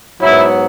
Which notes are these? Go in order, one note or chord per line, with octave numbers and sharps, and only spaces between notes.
G#2 F#3 B3 E4